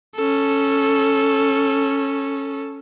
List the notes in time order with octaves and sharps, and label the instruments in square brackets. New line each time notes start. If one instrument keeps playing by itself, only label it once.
[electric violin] C#4 A4